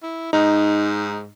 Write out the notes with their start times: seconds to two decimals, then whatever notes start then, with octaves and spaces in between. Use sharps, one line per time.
0.03 E4
0.33 G#2 D#4